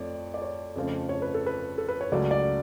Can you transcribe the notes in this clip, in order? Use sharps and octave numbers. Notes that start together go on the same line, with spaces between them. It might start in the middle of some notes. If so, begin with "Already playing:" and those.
Already playing: F2 F3 A3 C#5 D5
D5
C#5
F2 C#3 F3 A3
C#5
B4
A4
B4
A4
B4
C#5
C#2 C#3 F#3 A3 D5
D5